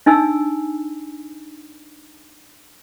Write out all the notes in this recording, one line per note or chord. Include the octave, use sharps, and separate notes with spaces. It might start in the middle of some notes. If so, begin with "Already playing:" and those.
D4 D#4 G#5 E6